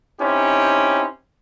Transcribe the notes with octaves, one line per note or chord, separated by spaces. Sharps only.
C4 C#4 D#4 E4 G4